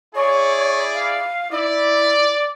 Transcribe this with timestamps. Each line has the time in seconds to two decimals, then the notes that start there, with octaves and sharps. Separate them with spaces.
0.15 E4 G#4 C#5 D5
0.94 F5
1.51 E4 D5